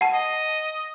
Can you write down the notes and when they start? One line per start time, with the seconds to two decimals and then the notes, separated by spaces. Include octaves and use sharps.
0.01 F#5 A5
0.14 D#5